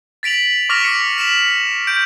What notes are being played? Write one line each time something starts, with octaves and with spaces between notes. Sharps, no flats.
A6 B6 D7 F7 F#7
C#6 D6 F6 A#6 B6 F7
C#7
B6 E7 F#7
G6 D7